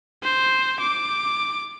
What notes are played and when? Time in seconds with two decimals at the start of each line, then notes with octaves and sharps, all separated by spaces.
0.23 C5
0.80 D6